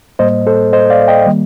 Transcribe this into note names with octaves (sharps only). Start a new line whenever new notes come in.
A2 G3 A#3 C5 D#5
A4 C5
C5 D#5
D5 F5
D#5 G5
D#3 G3 A#3